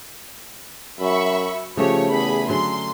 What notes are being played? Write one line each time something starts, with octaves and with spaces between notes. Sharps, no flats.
F#2 E5 B5 C#6
C#3 F3 A3 G4 C#5
E2 G#4 B5
D3 F#3 C#4 C6